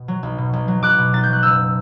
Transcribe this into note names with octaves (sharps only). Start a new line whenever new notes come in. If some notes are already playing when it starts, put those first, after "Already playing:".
Already playing: B2
F#3
B1
B2
B1
F#3
B1 D6 F#6
B2
B1 A6
G6
F#3 F#6
F#1 E6 G6